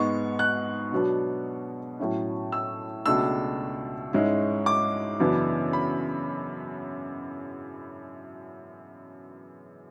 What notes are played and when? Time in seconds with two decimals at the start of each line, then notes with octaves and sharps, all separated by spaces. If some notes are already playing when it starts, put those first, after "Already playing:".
Already playing: G#2 G#3 B3 C#6
0.39 F#6
0.92 B2 F#3 B3 D4
1.99 A2 F#3 C#4 E4
2.52 E6
3.06 C#2 B2 A3 D4 E6
4.13 G#2 G#3 C#4 E4
4.66 D6
5.20 F#2 C#3 E3 B3 D4
5.73 B5